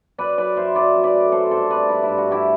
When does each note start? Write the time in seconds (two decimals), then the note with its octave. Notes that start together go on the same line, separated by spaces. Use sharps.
0.18 F#2 B4 D5
0.38 F#2 B4 D5
0.56 F#2 C5 E5
0.75 F#2 B4 D5
0.95 F#2
1.03 B4 D5
1.14 A3
1.32 F#3 A4 C5
1.51 G2 A4 C5
1.70 C4 B4 D5
1.89 G2 E4
2.03 E4
2.08 G2
2.18 F#4
2.27 G2 E4 G4